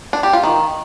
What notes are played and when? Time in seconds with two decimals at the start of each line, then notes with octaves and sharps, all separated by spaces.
0.13 D4
0.23 G4
0.33 F4
0.43 D#3